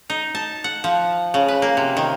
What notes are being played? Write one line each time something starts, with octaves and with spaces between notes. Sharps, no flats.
D#4
A5
F#5
F3
C#3
B4
A#3
C3
D#3